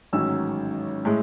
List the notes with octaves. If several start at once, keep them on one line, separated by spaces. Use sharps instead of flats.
A1 G#2 D#3 F#3 C#4 E6
A2 G#3